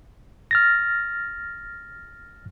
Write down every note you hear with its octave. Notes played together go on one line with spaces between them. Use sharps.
F6 A6 A#6